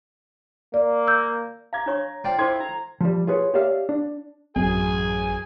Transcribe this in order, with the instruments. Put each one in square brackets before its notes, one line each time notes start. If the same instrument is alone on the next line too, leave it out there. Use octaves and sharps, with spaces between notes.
[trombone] A#3 [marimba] D5
[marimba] E6 G6
[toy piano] F5 D6 [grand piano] A#5 G#6
[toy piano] D4 C#5 C#6
[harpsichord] F4 G5 [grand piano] C5 [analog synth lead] D5
[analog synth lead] E4 [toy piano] A4 C5 D6 [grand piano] C6 G#6
[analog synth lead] A#5
[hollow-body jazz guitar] F3 G3
F4 G#4 B4 C#5
G4 C#5 D5 E5 F5
D4
[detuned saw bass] A1 [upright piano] F#2 [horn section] G#4 [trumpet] G#5